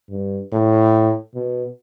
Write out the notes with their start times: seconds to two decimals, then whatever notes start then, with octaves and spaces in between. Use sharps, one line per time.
0.10 G2
0.52 A2
1.35 B2